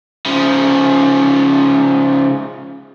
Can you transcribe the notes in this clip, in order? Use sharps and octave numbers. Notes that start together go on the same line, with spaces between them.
C#3 F3